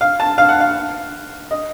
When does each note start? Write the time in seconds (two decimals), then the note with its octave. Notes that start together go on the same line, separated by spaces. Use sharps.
0.01 F5
0.20 A5
0.38 F5
0.49 F#5
0.60 F5
1.51 D#5